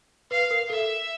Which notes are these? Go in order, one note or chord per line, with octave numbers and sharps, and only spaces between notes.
B4 F5
A#4
A4 E5